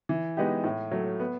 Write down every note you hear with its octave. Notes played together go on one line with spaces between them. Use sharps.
E3
G#3 B3 D#4 G4
A2
F#3 A3
B3